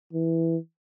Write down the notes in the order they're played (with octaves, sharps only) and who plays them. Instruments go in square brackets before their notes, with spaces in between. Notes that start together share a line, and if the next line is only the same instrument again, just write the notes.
[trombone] E3